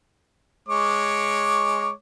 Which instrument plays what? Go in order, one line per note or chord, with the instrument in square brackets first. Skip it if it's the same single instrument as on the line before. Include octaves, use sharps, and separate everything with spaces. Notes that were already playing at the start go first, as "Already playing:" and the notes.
[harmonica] G#3 C#5 D6